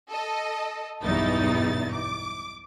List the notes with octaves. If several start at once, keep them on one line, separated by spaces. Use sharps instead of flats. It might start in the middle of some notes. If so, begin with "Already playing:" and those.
A4 D#5
B1 E2 G2 D#4 E4 A6
D6